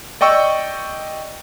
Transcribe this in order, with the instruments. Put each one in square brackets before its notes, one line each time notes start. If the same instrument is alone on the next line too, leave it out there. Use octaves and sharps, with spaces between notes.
[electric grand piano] D5 D#5 G5 C#6 E6